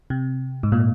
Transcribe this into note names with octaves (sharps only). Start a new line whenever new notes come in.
C3
G#2
A#2